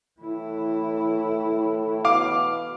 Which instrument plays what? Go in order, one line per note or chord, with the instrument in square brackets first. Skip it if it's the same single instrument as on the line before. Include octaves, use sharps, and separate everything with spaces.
[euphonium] A2 [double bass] E3 E4
[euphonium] B2 [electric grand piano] F5 D6